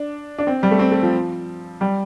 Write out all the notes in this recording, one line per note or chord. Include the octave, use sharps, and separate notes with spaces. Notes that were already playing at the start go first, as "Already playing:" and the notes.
Already playing: D4
D4
C4
G3
A3
C4
A3
F3
G3